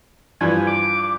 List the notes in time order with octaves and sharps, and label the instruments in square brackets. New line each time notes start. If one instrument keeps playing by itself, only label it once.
[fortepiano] G2 E3 F3 [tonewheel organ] G#5
[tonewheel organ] D6